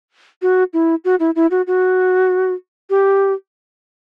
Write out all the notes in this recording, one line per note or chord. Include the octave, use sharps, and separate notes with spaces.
F#4
E4
F#4
E4
E4
F#4
F#4
G4